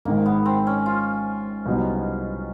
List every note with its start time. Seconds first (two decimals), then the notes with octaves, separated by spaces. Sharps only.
0.05 G#1 G#2 D#3 G#3 A#3
0.26 B3
0.46 C4
0.67 C#4
0.86 F4
1.66 C2 B2 F#3 B3 D#4